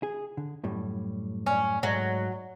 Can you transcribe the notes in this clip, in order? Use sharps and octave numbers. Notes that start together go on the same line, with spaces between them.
G#4
D3
F#2 A2 G3
C#4
G#2 F#3 A3